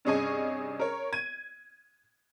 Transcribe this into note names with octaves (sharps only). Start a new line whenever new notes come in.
G2 C3 C#4 G#4 D#5 G#5
A#4 C#5
G#6 D#7